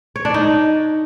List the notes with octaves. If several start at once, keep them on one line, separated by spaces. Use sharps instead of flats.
C#5
D4
D#4